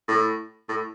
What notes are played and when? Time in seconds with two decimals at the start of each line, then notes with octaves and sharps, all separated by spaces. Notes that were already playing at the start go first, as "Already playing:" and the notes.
0.08 A2
0.69 A2